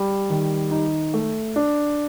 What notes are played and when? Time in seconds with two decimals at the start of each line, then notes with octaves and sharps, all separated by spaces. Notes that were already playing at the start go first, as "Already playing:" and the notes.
Already playing: G3
0.30 D#3
0.71 D#4
1.14 A3
1.56 D4